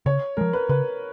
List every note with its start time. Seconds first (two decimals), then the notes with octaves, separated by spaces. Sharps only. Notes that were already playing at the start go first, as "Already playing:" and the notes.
0.06 C#3 C#5
0.37 F3 G#3 A#4
0.53 B4
0.69 C#3 B4